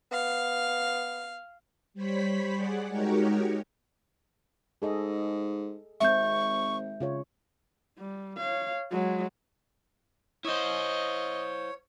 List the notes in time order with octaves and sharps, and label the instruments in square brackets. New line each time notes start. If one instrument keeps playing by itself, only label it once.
[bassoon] B3 [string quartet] F5
[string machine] G3 C5 C#5 B5 B6
G#4 D5 F#5
G#3 D#4 F#4 G4 A#4 C#5
[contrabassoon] G#2 [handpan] G#4 A4 D#5
[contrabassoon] G#1 [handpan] G#3 C4 [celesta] E5 G6 [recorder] C#6
[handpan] C#3 F4 C#5
[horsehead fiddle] G3
C#5 F5
F#3 G#3
[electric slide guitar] E4 C5 [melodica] C#5 [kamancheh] D#5